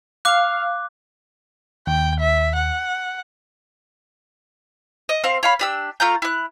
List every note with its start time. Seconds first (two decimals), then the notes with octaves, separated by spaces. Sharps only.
0.25 F5 D6 F#6
1.87 D#2 G5
2.20 E5
2.55 F#5
5.09 D#5
5.24 C4 F5
5.43 C#5 F5 B5
5.59 D4 G4 E6
6.00 A3 F4 A#5 G6
6.22 E4 F#6